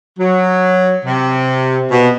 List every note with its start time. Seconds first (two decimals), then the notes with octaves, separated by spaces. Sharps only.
0.18 F#3
1.05 C3
1.91 B2